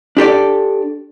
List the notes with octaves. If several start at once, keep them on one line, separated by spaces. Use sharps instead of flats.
D4 G4 A4 D5